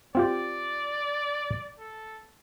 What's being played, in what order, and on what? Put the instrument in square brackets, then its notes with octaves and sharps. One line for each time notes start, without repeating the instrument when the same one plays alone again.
[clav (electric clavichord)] C4 F4 G4 [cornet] D5
[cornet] A4